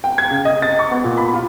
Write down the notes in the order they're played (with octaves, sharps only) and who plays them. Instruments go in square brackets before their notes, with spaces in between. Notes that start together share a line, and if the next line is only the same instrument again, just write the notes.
[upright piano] G5
G#6
C#3
D#5
A6
C#6
B3
A#2
B5
F4